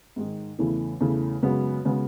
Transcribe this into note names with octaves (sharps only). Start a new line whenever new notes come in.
G#2 D#3 G#3
E2 C#3 E3 A3 E4
E2 C#3 E3 A3 E4
F#2 C#3 G#3 B3 F#4
C#3 G#3 B3 F#4